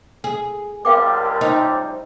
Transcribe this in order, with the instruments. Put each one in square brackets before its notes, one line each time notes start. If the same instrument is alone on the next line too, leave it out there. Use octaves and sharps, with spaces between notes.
[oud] G#4
[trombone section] C#2 C3 G3 [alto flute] A#4 [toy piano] F5 G5 D6
[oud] D#4 [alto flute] C5